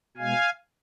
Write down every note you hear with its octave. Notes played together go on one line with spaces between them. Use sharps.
B2 G#3 F5 G#5